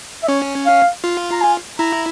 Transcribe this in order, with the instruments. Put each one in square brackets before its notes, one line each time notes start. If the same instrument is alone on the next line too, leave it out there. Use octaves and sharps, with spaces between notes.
[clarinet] E5
[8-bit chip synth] C#4 [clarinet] C#5
[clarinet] F5
[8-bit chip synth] F4
[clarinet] A#5
G#5
[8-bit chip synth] E4 [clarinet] A#5